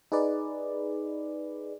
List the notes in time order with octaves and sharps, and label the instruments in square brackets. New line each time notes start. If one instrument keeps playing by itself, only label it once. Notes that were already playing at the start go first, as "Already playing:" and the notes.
[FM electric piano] D#4 G#4 B4 D5